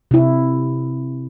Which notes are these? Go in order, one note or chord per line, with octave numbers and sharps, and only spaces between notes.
C3 E4